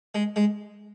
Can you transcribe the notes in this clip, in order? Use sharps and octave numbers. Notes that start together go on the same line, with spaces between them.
G#3
G#3